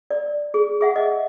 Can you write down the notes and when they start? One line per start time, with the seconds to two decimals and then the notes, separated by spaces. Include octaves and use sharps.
0.11 D5
0.54 G#4
0.81 G#4 E5 F#5
0.96 D#5